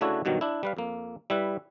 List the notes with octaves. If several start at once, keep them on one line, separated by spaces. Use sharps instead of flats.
C#3 A3 D4 E4 F#4 C#5
G2 B2 D#3 F#3
D4 E4
G3 B4 F5
F2 A#3
G3 E4 B4